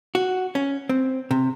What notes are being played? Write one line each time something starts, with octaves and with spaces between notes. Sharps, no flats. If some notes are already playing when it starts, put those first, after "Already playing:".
F#4
C#4
C4
C3